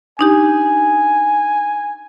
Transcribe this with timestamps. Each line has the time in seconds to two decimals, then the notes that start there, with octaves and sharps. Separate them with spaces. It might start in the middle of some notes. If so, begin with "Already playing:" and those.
0.19 D4 D#4 G4 G#5